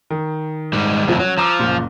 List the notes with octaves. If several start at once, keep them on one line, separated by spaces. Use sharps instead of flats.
D#3
G#2 G3
D#1 F2 A2 F3
F#3 C#4
F3 A#5 D6 E6
F#1 A#2